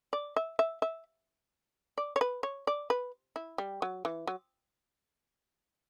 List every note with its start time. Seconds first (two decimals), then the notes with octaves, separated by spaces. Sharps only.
0.13 D5
0.36 E5
0.59 E5
0.82 E5
1.98 D5
2.16 C#5
2.21 B4
2.43 C#5
2.67 D5
2.90 B4
3.36 E4
3.58 G3
3.82 F#3
4.05 E3
4.27 F#3